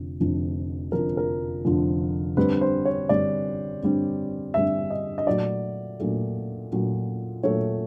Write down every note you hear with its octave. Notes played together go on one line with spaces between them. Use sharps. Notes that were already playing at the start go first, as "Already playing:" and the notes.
Already playing: F1 F2 D3
F1 F2 D3 F3
F1 F2 D3 F3 A#4
A#4
F1 F2 D3 F3
G2 D3 G3 C4 B4
C5
C#5
G2 D3 G3 C4 D5
G2 D3 G3 C4
G2 D3 G3 C4 E5
D#5
D#5
A#2 F#3 A3 D5
A#2 F#3 A3
A#2 F#3 A3
A#2 F#3 A3 C#5